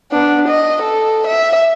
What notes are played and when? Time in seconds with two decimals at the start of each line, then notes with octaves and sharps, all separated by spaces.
0.11 B3 D4
0.48 D#5
0.82 A4
1.27 E5